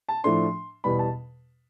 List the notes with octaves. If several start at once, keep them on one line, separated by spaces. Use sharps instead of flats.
A5
A2 F3 A3 D4 C6
E2 B2 G3 B3 B5
A5